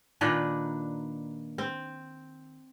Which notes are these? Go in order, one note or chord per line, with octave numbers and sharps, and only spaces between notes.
A#2 D#3 D4 B4
C4